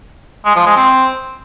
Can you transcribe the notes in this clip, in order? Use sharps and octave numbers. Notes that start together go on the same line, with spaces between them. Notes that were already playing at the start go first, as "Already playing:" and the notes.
G#3
F3
G#3
C4